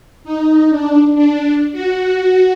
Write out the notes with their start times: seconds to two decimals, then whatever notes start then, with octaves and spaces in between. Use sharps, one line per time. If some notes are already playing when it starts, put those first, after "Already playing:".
0.24 D#4
0.70 D4
1.15 D4
1.72 F#4